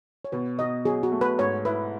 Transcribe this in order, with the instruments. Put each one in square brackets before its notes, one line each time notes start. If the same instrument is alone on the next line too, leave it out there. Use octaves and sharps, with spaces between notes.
[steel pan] C#5
[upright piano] B2 [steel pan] B4
[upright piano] B2 [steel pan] D#5
[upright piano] F#3 [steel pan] G#4
[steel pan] F#4
[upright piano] A3
[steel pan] B4
[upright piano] G#2 [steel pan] C#5
[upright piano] E4 [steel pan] B4